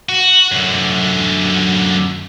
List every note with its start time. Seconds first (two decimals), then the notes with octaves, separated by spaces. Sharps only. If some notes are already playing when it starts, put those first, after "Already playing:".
0.09 F#4
0.52 F#2 D3